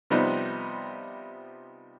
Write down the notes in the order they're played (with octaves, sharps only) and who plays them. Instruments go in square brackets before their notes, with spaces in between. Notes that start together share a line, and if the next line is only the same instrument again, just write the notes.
[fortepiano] C3 F3 G3 B3 D#4